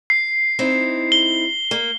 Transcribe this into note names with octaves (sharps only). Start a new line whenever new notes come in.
C7
C4 D#4 E4
G7
A#3